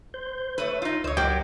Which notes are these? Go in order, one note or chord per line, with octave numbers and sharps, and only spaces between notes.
C5 G6
A3 B4 C#5 E5
D#4 F4
D2 C5 C#5 D#5 E6
C#2 F#3 A#3 G4 D#5 G5